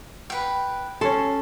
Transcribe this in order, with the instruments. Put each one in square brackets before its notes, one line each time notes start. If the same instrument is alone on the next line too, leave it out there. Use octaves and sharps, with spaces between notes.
[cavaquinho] B4 G5
[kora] C#4 A4 [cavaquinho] C6